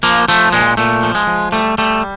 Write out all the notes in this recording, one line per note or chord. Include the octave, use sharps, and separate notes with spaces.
F3 A#3
F3 A3
A#2 G#3
A#2 A3
F3
G#3
F3
G3 A3
G3 A3